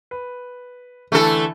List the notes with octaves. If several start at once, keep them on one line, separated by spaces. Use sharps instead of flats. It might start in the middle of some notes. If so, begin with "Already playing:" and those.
B4
D3 E3 A3 E4 A4